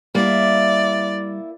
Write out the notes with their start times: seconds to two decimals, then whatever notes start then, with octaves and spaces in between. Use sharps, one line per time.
0.15 G3 A#3 E4 D5